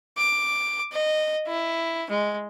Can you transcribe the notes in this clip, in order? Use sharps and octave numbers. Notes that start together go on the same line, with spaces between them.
D6
D#5
E4
G#3